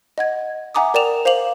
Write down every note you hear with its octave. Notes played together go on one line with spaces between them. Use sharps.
D#5 F#5 G#6
E5 F#5 G#5 A#5 D6 D#6
A#4 D5 G5 E7 F7
C5 F5 D6 F7 F#7